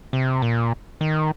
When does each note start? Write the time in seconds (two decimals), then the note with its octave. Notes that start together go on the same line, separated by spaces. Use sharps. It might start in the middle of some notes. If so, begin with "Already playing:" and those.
0.13 C3
0.42 A#2
1.01 D#3